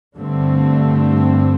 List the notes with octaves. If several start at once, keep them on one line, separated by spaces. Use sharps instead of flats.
G2 D3 A3 C4